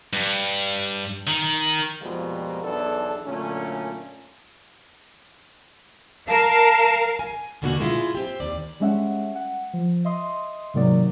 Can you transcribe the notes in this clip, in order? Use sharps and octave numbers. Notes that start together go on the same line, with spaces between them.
G2
D#3
F2 B2 F3 G3 G#3 A#3
B1 E2 E3 D4 A4
F#2 A#2 D3 A3 C#4
A#4 F5 A5
G#5
D#2 B2 D3 A#3 B3 F#4
A#2 G#3 E4 F4
C4 G4
D#2 D5
G3 G#3 C#4 E5 F#5
F#5
F3
D#5 E5 C6 D#6
G#2 C3 D#3 F#3 A#3 D5